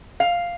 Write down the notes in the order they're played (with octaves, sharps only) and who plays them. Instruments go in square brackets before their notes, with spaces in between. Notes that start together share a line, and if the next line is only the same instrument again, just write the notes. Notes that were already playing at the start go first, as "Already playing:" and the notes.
[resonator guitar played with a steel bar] F5